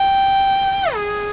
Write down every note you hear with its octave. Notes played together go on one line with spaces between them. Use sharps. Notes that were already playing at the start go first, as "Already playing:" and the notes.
Already playing: G5
G#4